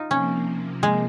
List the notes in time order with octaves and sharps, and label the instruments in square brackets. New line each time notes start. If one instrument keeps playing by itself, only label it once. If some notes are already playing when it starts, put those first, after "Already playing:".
Already playing: [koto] D#4 F4
[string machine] C3 F3 A#3 [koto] C#4
[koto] G#3